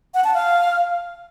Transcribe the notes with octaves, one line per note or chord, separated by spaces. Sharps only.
F#5
A5
F5